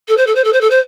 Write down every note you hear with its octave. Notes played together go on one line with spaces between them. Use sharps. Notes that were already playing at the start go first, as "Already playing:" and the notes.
A4
C5
A4
C5
A4
C5
A4
C5